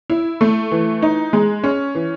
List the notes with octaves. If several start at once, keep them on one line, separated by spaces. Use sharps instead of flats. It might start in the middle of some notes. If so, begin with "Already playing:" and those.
E4
A3
E3
D#4
G#3
C#4
E3